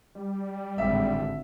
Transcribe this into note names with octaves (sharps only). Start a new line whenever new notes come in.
G3
G#1 A2 D3 E5